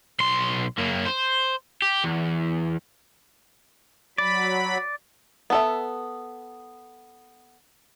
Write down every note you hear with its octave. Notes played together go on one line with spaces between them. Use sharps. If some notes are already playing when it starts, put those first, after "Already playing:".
B1 C6
F#2 A#3
C5
G4
E2
F#3 D5 B5
B3 A4 E5